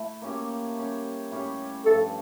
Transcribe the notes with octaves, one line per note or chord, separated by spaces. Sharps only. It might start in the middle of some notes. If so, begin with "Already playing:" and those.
Already playing: A3 E4
A#3 C#4 G4
G3 C#4 G4
A2 G3 C#4
G2 F3 A3 A4